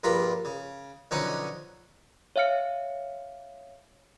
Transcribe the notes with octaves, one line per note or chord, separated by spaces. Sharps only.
A#1 G2 F4 A#4 B5
C#3
B1 D3 F3 C#4 D#4 F#5
C#5 E5 F5 F6 C#7